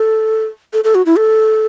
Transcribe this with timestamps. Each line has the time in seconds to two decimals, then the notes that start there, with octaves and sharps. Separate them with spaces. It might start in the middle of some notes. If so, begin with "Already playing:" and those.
Already playing: A4
0.73 A4
0.84 A4
0.95 F#4
1.06 E4
1.16 A4